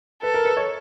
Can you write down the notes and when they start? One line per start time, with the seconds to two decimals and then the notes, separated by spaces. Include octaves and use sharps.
0.23 A4 B4
0.34 A#4
0.45 B4
0.57 C#5